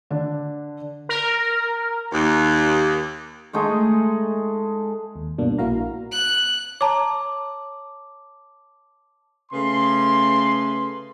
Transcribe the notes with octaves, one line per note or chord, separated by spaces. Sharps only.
D3 D4
A#4
D#2
G#3 A3 D#4 G#4
D#2
G2 B2 A#3 D4
A#1 A#3 E4 F#4 F5 A#5
F#6
C#5 A5 A#5 D6
C#3 A3 B4 C6